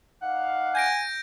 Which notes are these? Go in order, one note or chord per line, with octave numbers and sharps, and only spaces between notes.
D#4 D5 F5 F#5
G#5 G6 A#6 D7